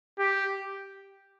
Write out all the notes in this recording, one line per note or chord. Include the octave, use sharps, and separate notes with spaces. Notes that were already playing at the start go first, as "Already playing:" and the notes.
G4